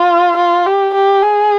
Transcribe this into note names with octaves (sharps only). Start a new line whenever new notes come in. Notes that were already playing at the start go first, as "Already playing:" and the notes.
Already playing: F4
F4
G4
G4
G#4